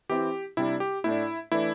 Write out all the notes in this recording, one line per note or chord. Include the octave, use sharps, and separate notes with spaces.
E3 C4 E4 G4
C3 G3 D4 E4
G4
A2 A3 D4 E4
E3 A3 D4 E4